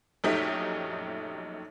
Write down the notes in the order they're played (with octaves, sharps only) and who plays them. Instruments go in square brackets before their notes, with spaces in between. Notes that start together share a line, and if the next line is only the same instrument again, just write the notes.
[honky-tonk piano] A#1 F#2 A3 D#4 G4 B6